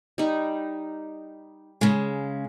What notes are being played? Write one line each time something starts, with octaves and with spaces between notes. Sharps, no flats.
G3 D#4
C#3 G#3